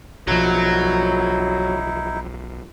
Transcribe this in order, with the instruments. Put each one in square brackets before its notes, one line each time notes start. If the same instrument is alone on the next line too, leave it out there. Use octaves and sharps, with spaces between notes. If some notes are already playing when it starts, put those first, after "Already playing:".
[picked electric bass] B1 F3 [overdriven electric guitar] F#3 [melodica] D#4 E4